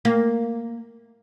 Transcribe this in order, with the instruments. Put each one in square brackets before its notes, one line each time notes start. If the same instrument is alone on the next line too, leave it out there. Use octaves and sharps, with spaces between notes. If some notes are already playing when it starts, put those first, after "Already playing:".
[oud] A#3